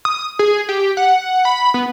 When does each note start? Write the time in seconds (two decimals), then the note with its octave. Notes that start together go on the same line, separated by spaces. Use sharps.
0.05 D#6
0.39 G#4
0.69 G4
0.97 F#5
1.45 B5
1.74 B3